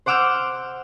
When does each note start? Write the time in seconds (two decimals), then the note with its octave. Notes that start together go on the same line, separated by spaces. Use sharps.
0.06 C5 F#5 D6 E6 F6 G6